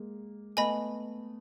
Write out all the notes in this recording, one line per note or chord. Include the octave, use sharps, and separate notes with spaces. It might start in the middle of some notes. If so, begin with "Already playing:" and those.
Already playing: G#3 A#3
A3 B3 D#5 G#5 B5